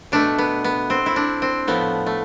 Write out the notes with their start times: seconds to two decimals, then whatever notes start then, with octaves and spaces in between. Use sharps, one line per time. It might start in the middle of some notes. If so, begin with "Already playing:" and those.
0.12 B2 A3 D4
0.38 B3
0.64 B3
0.90 C4
1.06 E4
1.16 D4
1.42 C4
1.67 A2 F3 A3 B3
2.06 A3